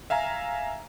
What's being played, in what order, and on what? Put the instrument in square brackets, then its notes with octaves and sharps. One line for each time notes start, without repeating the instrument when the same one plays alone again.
[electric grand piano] E5 F5 G#5 A#5